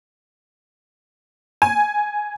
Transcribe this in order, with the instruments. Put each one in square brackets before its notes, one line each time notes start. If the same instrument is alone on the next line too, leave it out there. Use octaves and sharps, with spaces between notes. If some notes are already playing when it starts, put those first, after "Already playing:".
[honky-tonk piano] G#5